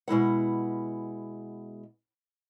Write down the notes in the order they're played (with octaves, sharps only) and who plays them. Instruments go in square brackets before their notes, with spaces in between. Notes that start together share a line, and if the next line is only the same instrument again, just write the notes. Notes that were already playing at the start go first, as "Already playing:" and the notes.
[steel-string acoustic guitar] B2 G#3 E4 F#5